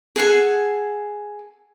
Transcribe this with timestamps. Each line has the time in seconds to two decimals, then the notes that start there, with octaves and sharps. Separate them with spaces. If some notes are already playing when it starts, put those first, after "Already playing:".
0.16 G#4 A4 F#5 G#5